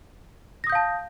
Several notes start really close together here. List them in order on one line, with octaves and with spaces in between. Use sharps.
A#6 D#6 G6 F5 A5